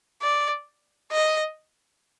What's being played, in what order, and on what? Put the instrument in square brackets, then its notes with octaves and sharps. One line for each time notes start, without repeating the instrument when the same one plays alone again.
[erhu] D5
D#5